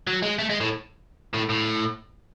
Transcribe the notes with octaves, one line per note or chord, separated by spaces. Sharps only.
F#3
G#3
A3
G#3
A2
A2
A2